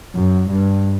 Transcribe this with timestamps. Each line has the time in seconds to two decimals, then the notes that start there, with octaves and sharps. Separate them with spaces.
0.16 F#2
0.50 G2